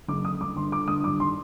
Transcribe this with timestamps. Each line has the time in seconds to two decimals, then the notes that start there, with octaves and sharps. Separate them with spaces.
0.08 F#1 D6
0.25 D3 D#6
0.40 G1 D6
0.56 G1 C6
0.72 D3 D6
0.88 G1 D#6
1.04 G2 D6
1.20 D#3 C6